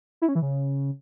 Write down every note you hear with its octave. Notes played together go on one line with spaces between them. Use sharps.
E4
C#4
E3
C#3